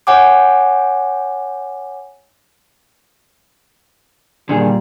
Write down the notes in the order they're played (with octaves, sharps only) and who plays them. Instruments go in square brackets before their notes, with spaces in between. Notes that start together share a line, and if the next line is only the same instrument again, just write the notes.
[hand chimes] C#5 F#5 G#5 D6
[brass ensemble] A#2 G3 [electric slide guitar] D3 D#3 G#4